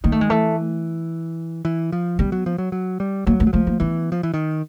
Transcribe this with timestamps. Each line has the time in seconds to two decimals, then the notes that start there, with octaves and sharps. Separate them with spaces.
0.04 D#3 A#3
0.12 A3
0.21 G#3
0.30 E3 A3
1.65 E3
1.92 F3
2.19 G3 B3
2.32 F#3
2.46 F3
2.58 F#3
2.72 F#3
3.00 G3
3.27 F#3 A#3
3.40 A3
3.47 F#3
3.53 F3 A3
3.67 A#3
3.80 E3 B3
4.12 F3
4.23 E3
4.34 D#3